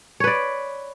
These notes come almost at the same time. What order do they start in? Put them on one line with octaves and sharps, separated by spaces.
C#5 B4 D5